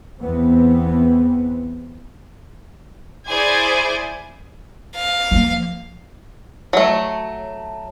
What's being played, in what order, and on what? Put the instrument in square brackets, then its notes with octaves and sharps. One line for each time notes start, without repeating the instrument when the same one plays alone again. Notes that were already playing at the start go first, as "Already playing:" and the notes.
[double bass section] E2 E3 B3 C4
[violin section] E4 G#4 C5 D5 G#5
[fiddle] F5
[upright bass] F3 A#3
[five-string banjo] F#3 A3